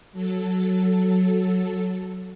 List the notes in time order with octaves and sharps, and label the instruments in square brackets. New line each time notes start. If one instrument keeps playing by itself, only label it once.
[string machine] F#3 A4